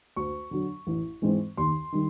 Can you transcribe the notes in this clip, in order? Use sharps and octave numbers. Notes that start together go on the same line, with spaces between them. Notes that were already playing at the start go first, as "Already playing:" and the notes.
D2 C#6
D3 F#3
A1
G#2 E3 G#3 C4
D#2 C6
D#3 G3